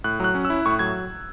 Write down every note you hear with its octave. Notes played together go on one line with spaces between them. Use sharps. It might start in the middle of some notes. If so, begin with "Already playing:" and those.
A2 F#6
F#3 F#6
C#4
E6
E4
A2 C#6
F#3 G#6